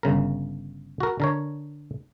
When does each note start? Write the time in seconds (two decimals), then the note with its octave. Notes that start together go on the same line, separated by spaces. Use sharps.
0.03 G1 C#3 A#4
1.00 F#4 A#4
1.20 D3 A#4 C#5